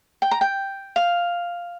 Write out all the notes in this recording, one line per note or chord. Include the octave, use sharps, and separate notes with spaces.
G5
A#5
G5
F5